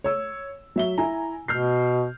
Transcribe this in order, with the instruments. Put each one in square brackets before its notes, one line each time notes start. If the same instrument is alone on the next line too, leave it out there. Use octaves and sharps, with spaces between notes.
[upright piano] C#5 E6
F#3 E5 G7
E4 G#5 A#5
[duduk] B2 [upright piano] F6 G6 C7